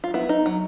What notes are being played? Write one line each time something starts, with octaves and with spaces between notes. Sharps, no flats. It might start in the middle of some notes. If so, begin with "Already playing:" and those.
F4
B3 E4
D#4
F#3